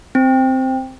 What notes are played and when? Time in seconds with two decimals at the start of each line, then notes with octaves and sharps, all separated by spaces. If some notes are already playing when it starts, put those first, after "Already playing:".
0.15 C4